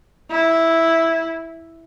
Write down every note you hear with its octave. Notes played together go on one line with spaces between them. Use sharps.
E4